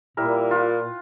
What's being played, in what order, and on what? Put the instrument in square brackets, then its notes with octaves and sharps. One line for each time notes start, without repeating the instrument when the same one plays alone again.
[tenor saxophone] A#2 [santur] G3 E4 A#4
[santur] F4 B4